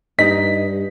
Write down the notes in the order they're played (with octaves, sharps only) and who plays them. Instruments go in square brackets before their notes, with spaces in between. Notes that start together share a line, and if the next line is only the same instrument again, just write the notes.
[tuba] G2 [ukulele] D#4 D#5 [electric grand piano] B6